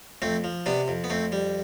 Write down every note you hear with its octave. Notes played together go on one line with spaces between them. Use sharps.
F2 A3 C4
F3
C3 B3 D4
F2
B3
F2 A3 C4
G3